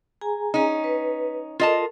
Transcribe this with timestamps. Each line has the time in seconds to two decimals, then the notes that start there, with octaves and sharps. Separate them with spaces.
0.21 G#4 G#5 A#5
0.54 C#4 D#4
0.84 B4
1.60 F4 A4 A#4 D#5 A5